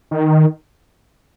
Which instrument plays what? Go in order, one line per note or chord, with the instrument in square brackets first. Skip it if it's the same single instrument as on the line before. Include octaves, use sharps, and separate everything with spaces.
[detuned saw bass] D#3